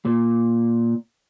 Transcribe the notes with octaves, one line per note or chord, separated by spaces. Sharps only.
A#2